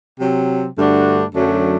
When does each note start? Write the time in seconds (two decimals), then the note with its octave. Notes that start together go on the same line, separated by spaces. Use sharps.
0.19 C3 F#3 C4
0.77 G2 D3 A3 D4 F#4
1.35 F#2 D3 F#3 A3 D4